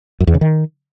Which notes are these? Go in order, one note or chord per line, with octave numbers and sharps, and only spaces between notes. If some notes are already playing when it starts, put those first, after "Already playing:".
F#2
E2
C#3
D#3